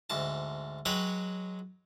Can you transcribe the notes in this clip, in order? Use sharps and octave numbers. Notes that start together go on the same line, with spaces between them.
D2 G#2 A5
F#3 G#3 B4 C#5 F#5 G5